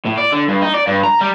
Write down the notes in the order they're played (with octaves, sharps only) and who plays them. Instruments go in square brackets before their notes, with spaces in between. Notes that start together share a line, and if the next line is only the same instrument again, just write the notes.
[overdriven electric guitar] A2
D5
D3
G2
D#4
D5
G2
A#5
G3